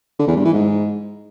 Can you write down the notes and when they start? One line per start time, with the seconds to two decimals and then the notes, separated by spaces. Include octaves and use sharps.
0.19 D3
0.28 E2
0.36 G2
0.45 E3
0.53 G#2